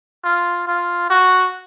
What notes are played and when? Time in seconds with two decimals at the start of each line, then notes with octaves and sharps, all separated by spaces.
0.24 F4
0.68 F4
1.10 F#4